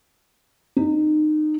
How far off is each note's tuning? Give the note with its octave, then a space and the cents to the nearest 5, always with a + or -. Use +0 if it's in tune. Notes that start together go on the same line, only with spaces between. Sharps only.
D#4 -25